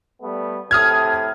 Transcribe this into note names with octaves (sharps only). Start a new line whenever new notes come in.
G3 A3 B3
A2 C3 A4 D#6 F6 G#6